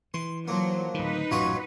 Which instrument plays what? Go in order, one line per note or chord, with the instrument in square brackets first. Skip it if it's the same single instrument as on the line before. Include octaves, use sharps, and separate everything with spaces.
[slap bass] E3 [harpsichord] C6
[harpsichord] F3 A#3 [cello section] F#3
[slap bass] D1 D#3 [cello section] D#4 B4
[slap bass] A1 F#2 A#2 [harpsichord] F#3 F4 C#5